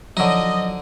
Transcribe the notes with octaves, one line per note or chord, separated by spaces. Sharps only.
D3 F3 F#3 D#4 D#5